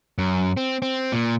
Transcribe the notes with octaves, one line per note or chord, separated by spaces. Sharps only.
F#2
C4
C4
A#2